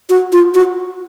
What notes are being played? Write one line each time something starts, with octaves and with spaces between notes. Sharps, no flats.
F#4
F4
F#4